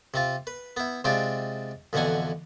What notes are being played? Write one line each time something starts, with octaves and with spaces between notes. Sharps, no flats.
C3 C4 F4
B4
B3 E4
C3 G#3 C4 D4 F4 G5
F2 B2 D3 E3 F#5 G#5